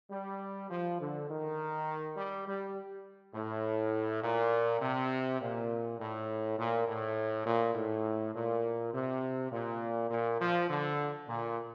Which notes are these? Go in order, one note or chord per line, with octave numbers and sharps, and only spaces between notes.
G3
F3
D3
D#3
G3
G3
A2
A#2
C3
A#2
A2
A#2
A2
A#2
A2
A#2
C3
A#2
A#2
F3
D3
A#2